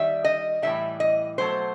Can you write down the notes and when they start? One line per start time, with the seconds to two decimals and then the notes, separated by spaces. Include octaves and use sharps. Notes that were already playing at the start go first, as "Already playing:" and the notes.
Already playing: D#3 G3 E5
0.24 D#5
0.62 A2 E3 G3 E5
1.00 D#5
1.38 B2 F#3 A3 C5